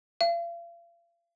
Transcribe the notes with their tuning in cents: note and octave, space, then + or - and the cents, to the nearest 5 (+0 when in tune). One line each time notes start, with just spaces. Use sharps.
F5 -40